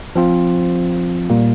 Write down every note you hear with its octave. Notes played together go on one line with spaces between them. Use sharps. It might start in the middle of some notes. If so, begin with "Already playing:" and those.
F3 C4 F4
A#2 G3 A#3